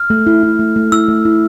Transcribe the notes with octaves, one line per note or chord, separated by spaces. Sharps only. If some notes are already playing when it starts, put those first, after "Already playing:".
Already playing: F6
A3
E4
E4
A3
A3
E4 E6
A3
E4